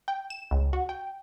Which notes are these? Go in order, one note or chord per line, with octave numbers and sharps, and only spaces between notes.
G5
E7
C#2
F#4
G5